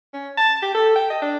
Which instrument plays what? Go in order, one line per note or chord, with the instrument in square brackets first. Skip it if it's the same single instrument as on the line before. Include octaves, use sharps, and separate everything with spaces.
[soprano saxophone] C#4
A5
G4
A4
G5
D#5
D4